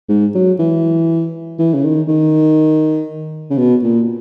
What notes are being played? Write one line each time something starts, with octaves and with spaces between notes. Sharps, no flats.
G#2
F#3
E3
E3
C#3
D#3
D#3
C#3
B2
A#2